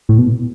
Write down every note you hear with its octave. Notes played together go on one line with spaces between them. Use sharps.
A2
B2